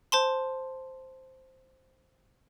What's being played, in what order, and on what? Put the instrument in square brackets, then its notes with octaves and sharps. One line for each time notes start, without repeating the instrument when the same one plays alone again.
[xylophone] C5 A5 C6